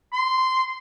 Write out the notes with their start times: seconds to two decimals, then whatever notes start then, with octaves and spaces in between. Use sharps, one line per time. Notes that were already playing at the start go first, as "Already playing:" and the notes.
0.13 C6